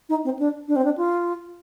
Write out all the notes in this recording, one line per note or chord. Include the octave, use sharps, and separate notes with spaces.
D#4
C4
D4
D4
C4
D4
F4